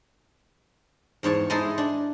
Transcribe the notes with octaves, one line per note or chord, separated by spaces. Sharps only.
E2 G#2 C#5 A5
G#3 D#4 E4 A4 C6
D4